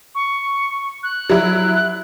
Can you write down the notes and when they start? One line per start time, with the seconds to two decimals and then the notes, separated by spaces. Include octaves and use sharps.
0.15 C#6
1.03 F#6
1.30 F#3 E4